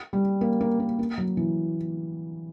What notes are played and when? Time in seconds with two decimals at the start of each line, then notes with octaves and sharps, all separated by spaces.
0.13 G3
0.41 A#3
0.61 A#3
0.80 A#3
0.99 A#3
1.18 F#3
1.37 E3